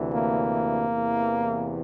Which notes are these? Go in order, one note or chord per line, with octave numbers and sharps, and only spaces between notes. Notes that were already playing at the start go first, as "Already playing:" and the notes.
Already playing: D2 C3 E3
A#3
E2 C3 E3